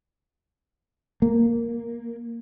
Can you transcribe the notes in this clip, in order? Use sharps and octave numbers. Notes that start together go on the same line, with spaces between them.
A#3